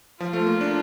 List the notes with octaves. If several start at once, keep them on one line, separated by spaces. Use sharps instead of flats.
F3 F4
A3
A#3
D4